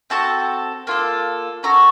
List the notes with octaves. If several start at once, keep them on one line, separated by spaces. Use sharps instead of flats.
C4 F#4 A4 A5
A#3 F4 A4
C#4 F#4 A4 A#5